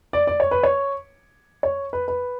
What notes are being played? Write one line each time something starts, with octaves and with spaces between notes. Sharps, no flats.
D5
D5
C#5
B4
C#5
C#5
B4
B4